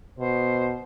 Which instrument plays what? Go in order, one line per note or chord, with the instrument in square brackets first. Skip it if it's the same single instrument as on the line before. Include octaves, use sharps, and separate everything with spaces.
[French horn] B2 [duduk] C5